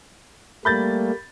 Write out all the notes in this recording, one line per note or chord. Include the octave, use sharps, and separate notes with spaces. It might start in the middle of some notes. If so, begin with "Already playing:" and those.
G3 A3 A#3 B5 G6 A6